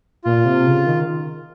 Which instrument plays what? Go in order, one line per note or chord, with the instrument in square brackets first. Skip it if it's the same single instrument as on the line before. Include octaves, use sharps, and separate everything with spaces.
[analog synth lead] A#2 [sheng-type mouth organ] F4
[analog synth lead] C3
C#3
D#3